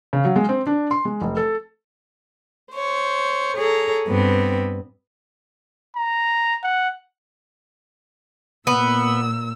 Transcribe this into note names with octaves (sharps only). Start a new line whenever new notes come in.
C#3
F#3
G#3
C4
D4
C6
G#3
F1
A4
C5 C#5
G#4 A4 C#5 A#5
G2 B3 C4 B4
A#5
F#5
A#2 B3 E6